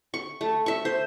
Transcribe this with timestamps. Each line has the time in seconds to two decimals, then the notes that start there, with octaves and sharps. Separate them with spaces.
0.14 C#6
0.41 A3
0.66 E5 C#6
0.85 C5